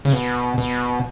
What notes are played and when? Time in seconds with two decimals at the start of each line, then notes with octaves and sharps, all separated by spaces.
0.05 C#3
0.13 B2
0.58 B2